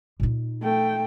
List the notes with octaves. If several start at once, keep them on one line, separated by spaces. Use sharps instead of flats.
A#2 D#4
A3 G5